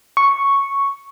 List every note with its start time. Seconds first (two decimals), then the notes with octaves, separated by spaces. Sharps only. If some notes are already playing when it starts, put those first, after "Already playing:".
0.17 C#6